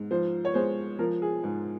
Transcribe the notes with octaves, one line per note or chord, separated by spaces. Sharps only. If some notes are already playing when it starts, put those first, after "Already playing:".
Already playing: G#2
F3 C5
C#5
G#3 C5
F3 A#4
G#4
G#2